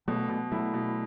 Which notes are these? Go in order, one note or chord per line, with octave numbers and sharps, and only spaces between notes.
B2 F#3 A3
B2
F#3 A3 E4
B2